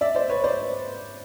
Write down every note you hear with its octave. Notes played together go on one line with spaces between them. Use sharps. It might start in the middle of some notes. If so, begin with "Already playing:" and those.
D5 E5
C5 D5
B4 C#5
C5 D5